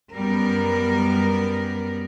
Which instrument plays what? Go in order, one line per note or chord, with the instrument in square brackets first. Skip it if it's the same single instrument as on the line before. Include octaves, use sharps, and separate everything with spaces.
[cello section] F#2 G3 B3 A#4